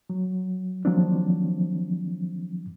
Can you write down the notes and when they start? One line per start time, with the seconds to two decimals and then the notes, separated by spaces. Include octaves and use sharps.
0.10 F#3
0.85 D#3 F3 F#3 A#3 C4 D4